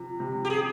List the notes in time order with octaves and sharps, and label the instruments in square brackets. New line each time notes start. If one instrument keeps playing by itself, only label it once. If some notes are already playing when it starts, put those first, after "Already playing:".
Already playing: [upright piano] C3 F3
C3
[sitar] G4
G#4